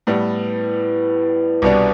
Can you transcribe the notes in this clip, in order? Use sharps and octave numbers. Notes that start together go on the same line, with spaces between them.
A2 G3 B3
C2 B2 G3 B3 D4